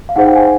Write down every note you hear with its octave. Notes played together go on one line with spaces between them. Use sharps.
F5
D#4 G#4 C5 F#5
G5
G#5